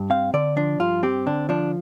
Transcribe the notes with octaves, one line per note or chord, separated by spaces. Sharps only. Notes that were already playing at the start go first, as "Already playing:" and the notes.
Already playing: G2
C4 F5
D3 D5
F3 D4
G2 F4
C4 G4
D3 D4
F3 D4